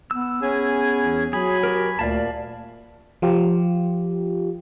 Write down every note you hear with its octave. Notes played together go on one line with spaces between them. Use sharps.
B3 E6
B3 C#4 G#4 G#5
E2
F#3 G#4 G#5 B5
F#4 G4 A#4
D2 A#2 D5 F5 A5
F3 F4 G4